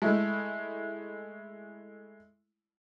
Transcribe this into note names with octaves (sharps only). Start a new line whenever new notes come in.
G#3 A3 E4